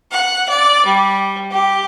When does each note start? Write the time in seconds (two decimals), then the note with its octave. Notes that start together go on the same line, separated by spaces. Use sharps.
0.12 F#5
0.49 D5
0.86 G3
1.51 G4